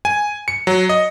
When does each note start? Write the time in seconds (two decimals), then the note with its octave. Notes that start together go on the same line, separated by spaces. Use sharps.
0.05 G#5
0.48 C#7
0.67 F#3
0.89 D#5